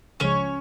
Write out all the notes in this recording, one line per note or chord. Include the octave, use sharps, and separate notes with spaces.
C#2 C#3 F3 G#3 C#4 C#5